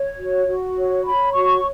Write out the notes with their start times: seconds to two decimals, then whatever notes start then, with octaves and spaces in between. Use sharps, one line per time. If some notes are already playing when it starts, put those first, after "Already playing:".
Already playing: C#5
0.17 F#4
0.47 F#4
0.76 C#5
1.05 C#5 B5
1.35 F#4 C#6